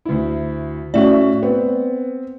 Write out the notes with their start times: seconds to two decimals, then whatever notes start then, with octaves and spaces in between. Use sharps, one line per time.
0.05 D2 E4
0.94 A2 A3 C#4 F#4 D5 E5
1.43 B3 C4